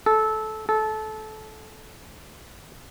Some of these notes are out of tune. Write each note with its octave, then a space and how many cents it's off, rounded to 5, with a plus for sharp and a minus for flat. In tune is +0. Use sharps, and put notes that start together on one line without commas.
A4 -15
A4 -20